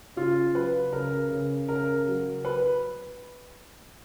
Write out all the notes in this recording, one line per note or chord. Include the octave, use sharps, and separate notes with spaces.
C#3 F4
F#3 B4
C#3 A#4
C#3
C#3 A#4
F#3
B4